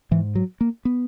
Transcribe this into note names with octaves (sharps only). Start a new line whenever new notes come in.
G#2 E3
F#3
A#3
B3